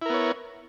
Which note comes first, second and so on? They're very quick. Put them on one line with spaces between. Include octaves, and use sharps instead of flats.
E4 A#4 B3 C#5